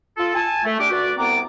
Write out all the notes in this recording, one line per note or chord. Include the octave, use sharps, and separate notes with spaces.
F4 A4
G#5 A5
A3
D4 G4 D6
D3 F#4 B4 D5
C2 B3 C4 A#5 D6